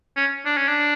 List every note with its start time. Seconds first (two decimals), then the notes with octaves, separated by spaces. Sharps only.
0.16 C#4
0.45 D4
0.57 C#4
0.68 D4